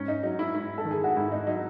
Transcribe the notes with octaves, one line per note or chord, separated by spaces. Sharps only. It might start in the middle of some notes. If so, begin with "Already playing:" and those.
Already playing: G#2 C#4
D#4
F#3 D#4
E4
G#2 E4
A4
D#3
G#4
F#4
G#2 E4
D#4
F#3 D#4